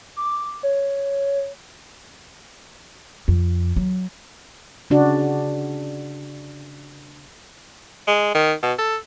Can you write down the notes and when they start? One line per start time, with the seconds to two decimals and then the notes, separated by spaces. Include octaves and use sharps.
0.16 D6
0.63 C#5
3.28 F2
3.76 F#3
4.90 C#3 D4 F#4
8.08 G#3
8.35 D#3
8.63 B2
8.79 A4